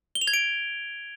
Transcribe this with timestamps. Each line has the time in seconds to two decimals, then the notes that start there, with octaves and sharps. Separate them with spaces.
0.15 G7
0.21 F7
0.27 G#6
0.34 D7